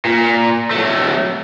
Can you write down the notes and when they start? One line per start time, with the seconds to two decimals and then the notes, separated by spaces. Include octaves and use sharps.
0.05 A#2
0.71 F#3 A3